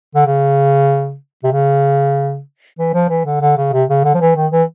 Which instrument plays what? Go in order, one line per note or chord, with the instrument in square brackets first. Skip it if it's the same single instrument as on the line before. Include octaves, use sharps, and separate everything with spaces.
[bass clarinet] D3
C#3
C3
C#3
E3
F3
E3
D3
D3
C#3
C3
C#3
D3
F3
E3
D#3
E3